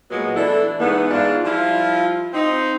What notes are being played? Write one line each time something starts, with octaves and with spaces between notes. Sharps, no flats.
A#2 F#3 G#3 B3
E3 A3 D4 E4 A4
G#2 E3 B3
G#2 D4 E4 F4
F3 G3 E4 F4
C4 D#4